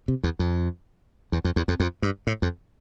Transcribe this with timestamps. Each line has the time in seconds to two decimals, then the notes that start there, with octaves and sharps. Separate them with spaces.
0.08 C3
0.23 E2
0.39 F2
1.32 E2
1.44 F2
1.56 E2
1.68 F2
1.80 F2
2.02 G2
2.27 A2
2.42 F2